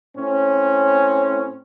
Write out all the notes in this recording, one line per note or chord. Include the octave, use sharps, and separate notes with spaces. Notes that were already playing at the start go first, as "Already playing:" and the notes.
A2 C4 C#4